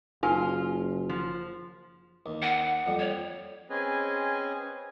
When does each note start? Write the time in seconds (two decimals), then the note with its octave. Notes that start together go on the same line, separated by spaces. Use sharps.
0.23 F#1 D#4 F4 A#4 G#5
1.09 F3
2.26 D#2
2.42 F#5
2.86 F2 G3
2.99 C#5
3.70 C4 C#4 G#4 B4 D#5 G#5